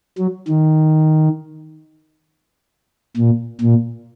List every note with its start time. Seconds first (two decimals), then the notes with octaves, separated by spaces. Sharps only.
0.18 F#3
0.48 D#3
3.17 A#2
3.61 A#2